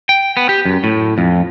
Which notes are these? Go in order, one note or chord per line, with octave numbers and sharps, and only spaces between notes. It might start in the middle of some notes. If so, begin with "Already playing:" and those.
G5
B3
G4
F#2
A2
F2